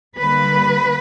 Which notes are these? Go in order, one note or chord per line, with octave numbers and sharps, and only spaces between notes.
D3 G3 A#3 B4